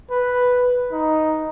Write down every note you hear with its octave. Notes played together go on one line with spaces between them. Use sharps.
B4
D#4